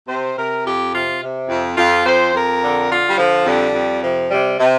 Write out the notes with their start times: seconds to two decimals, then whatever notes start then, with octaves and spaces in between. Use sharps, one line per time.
0.08 C3 C5
0.37 C3 A#4
0.65 F2 G4
0.93 C3 F4
1.22 C3
1.49 F2
1.77 F2 F4
2.05 F2 C5
2.33 F2 A#4
2.62 D3
2.90 D3 F4
3.09 G3
3.18 D3 F3
3.46 F2 G3
3.74 F2
4.02 C3 F3
4.30 C3 G3
4.59 C3